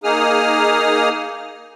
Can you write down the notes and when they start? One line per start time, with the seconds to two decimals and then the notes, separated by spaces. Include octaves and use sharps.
0.04 A#3 D#4 G#4 D#6 F6